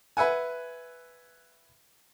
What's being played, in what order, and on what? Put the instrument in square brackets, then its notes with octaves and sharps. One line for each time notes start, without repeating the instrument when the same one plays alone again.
[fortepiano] B4 E5 F#5 G#5